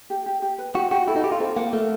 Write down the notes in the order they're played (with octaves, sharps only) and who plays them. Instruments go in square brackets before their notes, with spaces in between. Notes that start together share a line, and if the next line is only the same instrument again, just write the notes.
[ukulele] G4
G4
G4
B4
[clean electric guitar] F#4 [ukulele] G4
[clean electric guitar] F#4 [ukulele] G4
[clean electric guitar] E4 [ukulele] A4
[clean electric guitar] D#4
[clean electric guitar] G4 [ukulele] A4
[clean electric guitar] F4
[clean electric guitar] C4 [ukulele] A4
[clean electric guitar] A#3 [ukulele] F#5
[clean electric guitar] A3 [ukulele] A#4